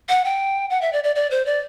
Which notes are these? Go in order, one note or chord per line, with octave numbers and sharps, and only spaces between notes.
F#5
G5
F#5
E5
D5
D5
D5
C5
D5